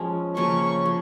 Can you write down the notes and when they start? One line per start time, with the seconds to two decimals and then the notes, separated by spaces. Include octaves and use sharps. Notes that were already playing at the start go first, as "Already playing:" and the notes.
Already playing: F3 G#3 C#4
0.36 C#3 F3 A#3 C#4 C#6
0.85 C#3 F3